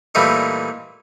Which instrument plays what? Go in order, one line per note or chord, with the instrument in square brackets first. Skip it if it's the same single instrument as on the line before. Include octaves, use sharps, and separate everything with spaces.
[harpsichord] A#2 E3 G3 A3 D#4